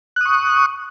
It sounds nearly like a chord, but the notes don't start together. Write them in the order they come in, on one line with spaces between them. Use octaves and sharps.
F#6 D#6 C#6